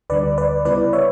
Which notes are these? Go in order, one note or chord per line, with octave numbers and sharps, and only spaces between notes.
D2 D3 G3 B4 D5
B4 D5
C#3 G3 B3 E4 B4 D5
C#5 E5